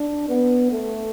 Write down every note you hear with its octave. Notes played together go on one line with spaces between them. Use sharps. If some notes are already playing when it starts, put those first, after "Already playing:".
Already playing: D4
B3
A3